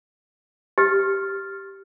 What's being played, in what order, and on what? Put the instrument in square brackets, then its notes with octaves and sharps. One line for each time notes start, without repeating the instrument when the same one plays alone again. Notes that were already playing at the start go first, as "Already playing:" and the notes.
[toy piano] G4 [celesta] F6 A6